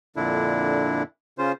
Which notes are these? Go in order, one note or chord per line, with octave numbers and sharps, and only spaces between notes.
F2 A#2 D3 D4 E4
C#3 C#4 F4 C5